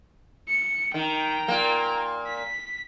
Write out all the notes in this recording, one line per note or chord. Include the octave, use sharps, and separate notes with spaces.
C#7
D#3 G5 A#5
A#2 A#3
B6